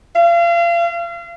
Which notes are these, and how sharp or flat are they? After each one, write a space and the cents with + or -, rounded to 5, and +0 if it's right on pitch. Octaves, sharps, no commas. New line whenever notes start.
F5 -35